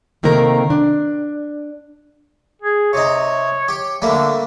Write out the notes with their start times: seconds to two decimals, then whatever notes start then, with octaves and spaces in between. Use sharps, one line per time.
0.23 C3 D#3 A3 A#3 A#4
0.70 D4
2.62 G#4
2.93 C3 D#4 C#5
3.68 G4
4.02 D3 G3 A3 A#3